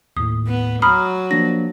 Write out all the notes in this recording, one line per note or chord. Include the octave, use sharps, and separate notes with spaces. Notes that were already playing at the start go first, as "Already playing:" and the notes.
D#2 A2 D#6
B3
F#3 A#5 B5 D#6 F6
F3 A#3 D4 A#6